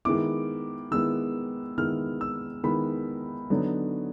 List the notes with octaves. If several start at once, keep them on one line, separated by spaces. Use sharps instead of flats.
D#3 G#3 B3 E4 D6
D#3 G#3 B3 E4 E6
D#3 G#3 B3 E4 F6
E6
D#3 G#3 B3 E4 B5
D3 F#3 B3 D#4